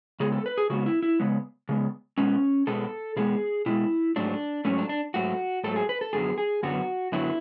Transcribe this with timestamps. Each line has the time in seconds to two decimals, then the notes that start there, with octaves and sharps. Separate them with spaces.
0.20 C#3 G#3 B3 G#4
0.32 A4
0.46 B4
0.58 G#4
0.70 C#3 G#3 B3 F#4
0.86 E4
1.03 E4
1.20 C#3 G#3 B3
1.69 C#3 G#3 B3
2.18 B2 G#3 B3 C#4
2.67 B2 G#3 B3 A4
3.16 B2 G#3 B3 G#4
3.66 B2 G#3 B3 E4
4.16 G#2 F#3 A3 D4
4.65 G#2 F#3 A3 C#4
4.78 D4
4.89 D4
5.14 G#2 F#3 A3 F#4
5.64 G#2 F#3 A3 A4
5.76 G#4
5.89 B4
6.01 A4
6.13 F#2 D3 F#3 B3 G#4
6.38 G#4
6.63 F#2 D3 F#3 B3 F#4
7.12 F#2 D3 F#3 B3 E4